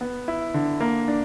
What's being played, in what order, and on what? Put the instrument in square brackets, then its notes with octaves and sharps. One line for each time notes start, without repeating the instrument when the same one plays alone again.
[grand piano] B3
E4
D3
A#3
D4